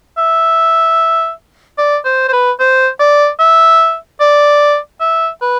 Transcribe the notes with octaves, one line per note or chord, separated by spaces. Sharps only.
E5
D5
C5
C5
B4
C5
D5
E5
D5
E5
B4